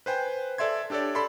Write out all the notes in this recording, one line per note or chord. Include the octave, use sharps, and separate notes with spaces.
B4 C5 G5 G#5
A4 D5 E5 C6 G#6
D4 G4 A4 C#5 D5
A4 D5 B5 C6